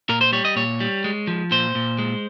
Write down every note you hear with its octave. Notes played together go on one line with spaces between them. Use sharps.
A#2 A#4
C5
G3 C#5
D#5
A#2 C#5
G3
G#3
F3
A#2 C5
A#2
G#3